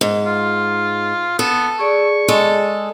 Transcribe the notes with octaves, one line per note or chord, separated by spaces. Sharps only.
G#2
F4
B3 A4
G#4 D5 C#6
G#3 A4